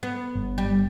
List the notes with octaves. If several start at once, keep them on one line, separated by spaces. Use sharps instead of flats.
B3
G1
G3